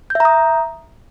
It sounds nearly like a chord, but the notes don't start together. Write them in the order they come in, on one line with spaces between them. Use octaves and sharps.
G6 E5 A#5 D#6